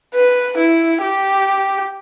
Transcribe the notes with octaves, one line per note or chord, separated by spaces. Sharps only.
B4
E4
G4